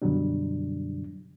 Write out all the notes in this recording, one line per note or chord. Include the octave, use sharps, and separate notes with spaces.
F#2 B2 D3 F#3 G3 D4